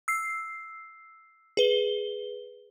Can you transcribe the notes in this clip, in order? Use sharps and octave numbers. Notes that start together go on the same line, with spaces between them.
E6 C7
G#4 B4 G7